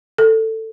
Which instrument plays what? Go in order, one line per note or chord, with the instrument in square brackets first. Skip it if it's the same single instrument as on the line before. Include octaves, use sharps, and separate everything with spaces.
[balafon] A4